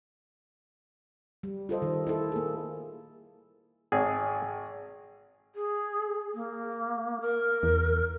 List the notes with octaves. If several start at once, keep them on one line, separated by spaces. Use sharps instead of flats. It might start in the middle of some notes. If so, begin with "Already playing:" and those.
G3
F4 A4 C5 D#5
D#3
E4 A4
A#3 G#4
G#1 G#4
G#4
A#3
A#4
E2